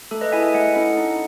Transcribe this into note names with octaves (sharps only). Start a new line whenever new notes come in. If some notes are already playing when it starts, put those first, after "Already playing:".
A3 A4
B4 D#5
E4 G#4 E5 G#5
E5 G#5
A3 D#5 F#5
C#4 E4 A4
D#4